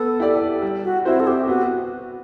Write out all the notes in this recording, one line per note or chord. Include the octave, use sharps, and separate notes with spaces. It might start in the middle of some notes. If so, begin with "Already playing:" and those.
Already playing: B3 A4
E4 G4 D5
G3
F#4
C4 E4 F#4 C5
A4
G4
B3 F#4